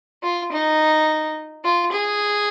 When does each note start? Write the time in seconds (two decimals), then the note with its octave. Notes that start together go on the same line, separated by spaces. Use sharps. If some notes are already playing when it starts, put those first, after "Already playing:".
0.23 F4
0.52 D#4
1.65 F4
1.92 G#4